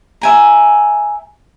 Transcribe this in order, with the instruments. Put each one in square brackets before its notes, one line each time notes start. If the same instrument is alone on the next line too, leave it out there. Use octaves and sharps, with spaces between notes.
[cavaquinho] E5 G#5 A#5